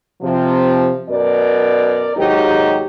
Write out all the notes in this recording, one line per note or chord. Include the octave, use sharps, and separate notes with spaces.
C3 F3
F#2 B2 A#4 D5
D#2 G#2 F#3 D#4 G4